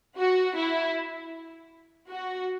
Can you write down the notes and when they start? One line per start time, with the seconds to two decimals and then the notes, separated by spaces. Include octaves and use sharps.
0.18 F#4
0.56 E4
2.08 F#4